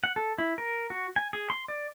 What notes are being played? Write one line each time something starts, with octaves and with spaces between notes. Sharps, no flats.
F#5
A4
E4
A#4
F#4
G#5
G#4
C6
D5